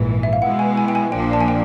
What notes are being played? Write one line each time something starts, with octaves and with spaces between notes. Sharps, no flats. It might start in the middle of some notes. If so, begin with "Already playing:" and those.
Already playing: A#1 G#2 E3
E5
F5
B2 G#3 B3 E4 F#5
G#5
G#5
G5
G#5
A#1 A#2 F3 A#3 D4 G5
A5
G#5
G5